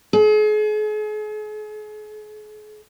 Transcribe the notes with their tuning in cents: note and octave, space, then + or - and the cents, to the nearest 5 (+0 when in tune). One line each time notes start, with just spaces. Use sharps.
G#4 +40